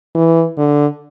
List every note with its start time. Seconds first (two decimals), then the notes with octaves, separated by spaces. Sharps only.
0.15 E3
0.57 D3